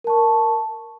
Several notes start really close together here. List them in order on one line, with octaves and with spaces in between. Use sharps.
A#4 A5 C#6